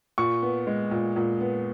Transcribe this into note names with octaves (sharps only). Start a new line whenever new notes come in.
A#2 C#6
B3
G#3
A#2
A#2
B3